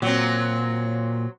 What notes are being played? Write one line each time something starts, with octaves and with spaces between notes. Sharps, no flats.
A#2 F#3 C4